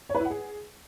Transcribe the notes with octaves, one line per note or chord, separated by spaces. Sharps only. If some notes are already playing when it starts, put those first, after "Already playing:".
C#5
B4
E4
F#5
G#4